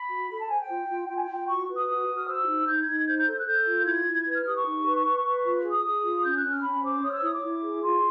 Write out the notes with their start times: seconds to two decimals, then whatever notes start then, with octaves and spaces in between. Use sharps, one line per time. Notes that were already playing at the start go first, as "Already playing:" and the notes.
Already playing: B5
0.10 F#4
0.30 A4 B5
0.40 A5
0.50 C5 G#5
0.60 G5
0.69 F4
0.89 F4
1.08 F4 G5
1.16 G#5
1.22 G5
1.29 F4
1.35 G5
1.48 F#4 C#6
1.68 B4
1.76 D#6
1.88 F#4 D#6
2.07 F#4
2.16 F6
2.27 C5 E6
2.47 D#4
2.67 D#4 G6
2.81 G#6
2.87 D#4
3.00 G#6
3.07 C5 G6
3.17 G6
3.27 A4
3.37 F#6
3.46 A4 G6
3.67 F4
3.86 E4 G#6
4.06 E4
4.26 B4
4.35 F6
4.45 G4 D#6
4.55 C#6
4.66 D#4
4.85 B4
5.05 B4
5.24 B4
5.45 F4
5.64 G#4
5.71 D#6
5.84 G#4 D#6
6.03 F4
6.23 C#4 G6
6.36 F#6
6.43 C#4
6.50 F6
6.63 C#4 B5
6.82 C5 D6
7.02 C#5 D#6
7.09 F6
7.13 E6
7.22 E4 D#6
7.32 D6
7.42 E4
7.61 G#4
7.81 F4 C6